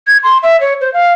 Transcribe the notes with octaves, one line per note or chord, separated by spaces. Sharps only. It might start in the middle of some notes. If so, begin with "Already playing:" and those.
G#6
C6
E5
C#5
C5
F5